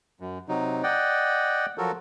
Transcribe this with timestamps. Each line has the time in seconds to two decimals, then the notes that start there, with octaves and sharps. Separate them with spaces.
0.20 F#2
0.49 C3 F#3 D#4
0.83 D5 D#5 F#5 G5
1.78 F3 F#3 F#4 A4 A#4